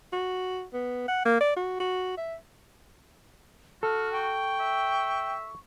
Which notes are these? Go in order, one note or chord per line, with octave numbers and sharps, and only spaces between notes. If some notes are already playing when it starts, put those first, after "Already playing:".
F#4
B3
F#5
A#3
D5
F#4
F#4
E5
F#4 A4 F6
G5 C#6
E5